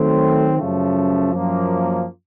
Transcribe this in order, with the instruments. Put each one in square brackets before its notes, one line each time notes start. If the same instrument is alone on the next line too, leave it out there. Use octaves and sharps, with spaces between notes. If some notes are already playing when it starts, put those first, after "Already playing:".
Already playing: [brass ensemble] D#3 F#3 A3 C4
F#2 C#3 F3 A3
F#2 F3 A#3